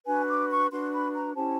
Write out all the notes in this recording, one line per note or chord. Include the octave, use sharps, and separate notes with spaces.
D4 F#4 B4 G#5
D6
C#6
D4 F#4 B4 C6
B5
A#5
C#4 E4 G4 C5 A5